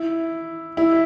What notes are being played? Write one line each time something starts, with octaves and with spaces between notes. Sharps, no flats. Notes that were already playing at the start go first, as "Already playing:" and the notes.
Already playing: E4
E4